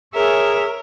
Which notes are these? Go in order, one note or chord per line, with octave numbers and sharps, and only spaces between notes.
G#4 A#4 C#5 E5